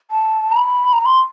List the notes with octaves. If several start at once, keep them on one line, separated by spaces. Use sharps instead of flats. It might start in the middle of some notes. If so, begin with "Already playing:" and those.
A5
A#5
B5
A#5
C6